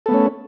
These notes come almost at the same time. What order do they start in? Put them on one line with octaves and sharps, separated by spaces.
A4 B3 A3 C#4